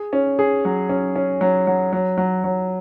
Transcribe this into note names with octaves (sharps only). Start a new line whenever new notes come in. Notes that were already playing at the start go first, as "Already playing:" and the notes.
Already playing: G#4
C#4
G#4
F#3
C#4
C#4
F#3
F#3
F#3
F#3
F#3